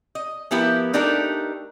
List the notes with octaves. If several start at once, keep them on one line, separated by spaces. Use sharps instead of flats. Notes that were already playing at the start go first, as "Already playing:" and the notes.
D#5
F3 B3 E4 G4 A#4
A3 D4 D#4 G4 A4 A#4